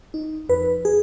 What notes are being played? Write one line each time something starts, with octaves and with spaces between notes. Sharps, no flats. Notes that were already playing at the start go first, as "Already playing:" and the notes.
D#4
F2 B4
G#4